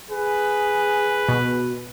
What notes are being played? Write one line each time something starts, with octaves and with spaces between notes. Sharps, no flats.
G#4 B4
B2